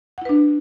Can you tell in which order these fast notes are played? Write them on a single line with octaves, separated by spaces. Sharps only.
F#5 E4 B4 D4